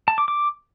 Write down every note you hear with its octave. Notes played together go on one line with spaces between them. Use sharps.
A5
D6
D6